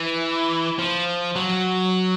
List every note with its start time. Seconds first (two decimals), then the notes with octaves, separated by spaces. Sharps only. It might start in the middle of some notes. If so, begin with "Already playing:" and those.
Already playing: E3
0.79 F3
1.36 F#3